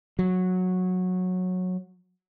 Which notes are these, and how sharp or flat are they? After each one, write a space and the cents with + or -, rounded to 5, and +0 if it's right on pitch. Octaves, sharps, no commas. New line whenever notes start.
F#3 -15